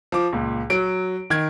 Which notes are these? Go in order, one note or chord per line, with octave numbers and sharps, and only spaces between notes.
F3 D6
C#2 A#2
F#3 D7
D#3 G#6